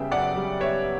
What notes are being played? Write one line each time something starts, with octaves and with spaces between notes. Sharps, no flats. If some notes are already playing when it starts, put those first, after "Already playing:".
Already playing: C#3 G3 B3 E5 G5
F#2 D5 F#5
G3
B3 C#5 E5